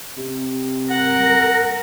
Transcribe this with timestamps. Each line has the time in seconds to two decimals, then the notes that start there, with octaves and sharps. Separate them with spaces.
0.17 C3
0.90 A#4 F#5